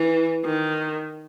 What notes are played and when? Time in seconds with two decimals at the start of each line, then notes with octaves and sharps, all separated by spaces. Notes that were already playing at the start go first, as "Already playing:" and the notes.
Already playing: E3
0.45 D#3